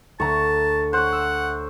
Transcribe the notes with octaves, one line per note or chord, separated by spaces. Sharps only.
D2 E5 A5 A#5 C#6
C5 C#5 F#5 F#6 G6
E6